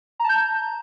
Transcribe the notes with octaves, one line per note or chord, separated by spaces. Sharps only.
A5 A#5 G6